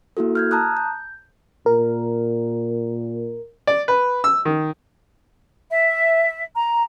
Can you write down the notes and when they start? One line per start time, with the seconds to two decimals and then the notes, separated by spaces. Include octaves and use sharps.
0.17 A#3 E4 F#4 A4
0.35 F6 G6 G#6
0.51 A5 A#5 D#6 F#6
0.77 G6
1.66 A#2 A#4
3.67 D5
3.88 B4
4.24 E6
4.45 D#3
5.71 E5
6.55 A#5